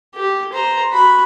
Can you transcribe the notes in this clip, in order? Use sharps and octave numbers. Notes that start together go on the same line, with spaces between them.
G4
C5 A#5
F#4 B5